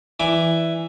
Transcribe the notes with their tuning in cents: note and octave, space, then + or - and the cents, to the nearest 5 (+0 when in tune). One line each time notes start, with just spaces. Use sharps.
E3 +5 D5 +0 D6 +0